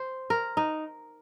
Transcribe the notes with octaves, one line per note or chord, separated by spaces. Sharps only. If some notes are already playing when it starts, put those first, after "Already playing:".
Already playing: C5
A#4
D#4